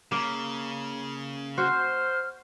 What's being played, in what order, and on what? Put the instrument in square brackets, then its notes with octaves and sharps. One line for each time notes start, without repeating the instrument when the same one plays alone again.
[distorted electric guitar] C#3 [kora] A#3
[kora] F#4 [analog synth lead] C5 [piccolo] F6